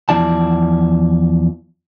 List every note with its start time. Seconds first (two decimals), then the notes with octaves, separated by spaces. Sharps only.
0.09 E2 F3 E4 D5 A5